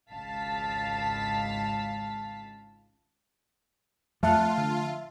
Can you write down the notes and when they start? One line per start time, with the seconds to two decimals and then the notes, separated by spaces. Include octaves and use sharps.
0.10 G#1 C#2 F5 A5 B6
4.23 F2 F3 A3 F4 E5 F#5 A5 F6
4.58 D3